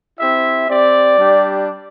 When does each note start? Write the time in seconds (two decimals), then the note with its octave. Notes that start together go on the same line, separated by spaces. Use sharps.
0.18 C4 E4 G4 E5
0.68 C4 G4 D5
1.18 G3 D4 G4